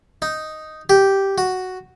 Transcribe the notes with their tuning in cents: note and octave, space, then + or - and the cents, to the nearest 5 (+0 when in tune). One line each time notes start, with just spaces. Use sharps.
D#4 +0
G4 -5
F#4 +0